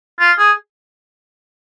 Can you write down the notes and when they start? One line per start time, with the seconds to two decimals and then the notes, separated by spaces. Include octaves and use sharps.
0.19 F4
0.38 G#4